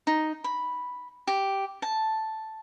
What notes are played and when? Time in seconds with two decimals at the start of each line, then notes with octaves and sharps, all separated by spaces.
0.07 D#4
0.44 B5
1.27 G4
1.82 A5